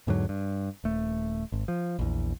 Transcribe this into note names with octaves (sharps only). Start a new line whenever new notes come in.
E2 G#2 D3 F#3
G2
D#1 A3
G#1
F3
A#1 E2